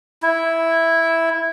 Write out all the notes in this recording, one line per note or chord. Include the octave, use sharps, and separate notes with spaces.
E4